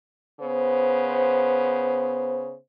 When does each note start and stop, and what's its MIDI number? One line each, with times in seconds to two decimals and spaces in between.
0.40 2.55 49
0.40 2.55 59
0.40 2.55 72